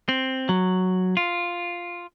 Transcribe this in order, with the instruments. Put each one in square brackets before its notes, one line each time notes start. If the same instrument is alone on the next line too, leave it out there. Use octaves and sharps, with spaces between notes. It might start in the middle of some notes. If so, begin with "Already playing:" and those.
[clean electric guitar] C4
F#3
F4